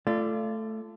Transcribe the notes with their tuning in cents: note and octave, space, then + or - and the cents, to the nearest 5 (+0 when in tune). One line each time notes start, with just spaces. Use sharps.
A3 +0 F4 -30 D5 +5